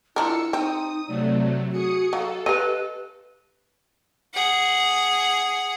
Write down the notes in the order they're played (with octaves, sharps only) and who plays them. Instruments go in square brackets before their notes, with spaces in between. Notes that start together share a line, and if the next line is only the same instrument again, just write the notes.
[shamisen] F3 D4 A#4 [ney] E4 [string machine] E6 C#7
[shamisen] C4 [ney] D#4 [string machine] D#6
[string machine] C3 F#3 A3 [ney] D5
[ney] F#4 [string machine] G#4 D#6 C#7
[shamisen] F#3 [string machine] A4 [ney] F5
[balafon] G4 [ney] B4 [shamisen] D#5 F5
[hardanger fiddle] G#4 F#5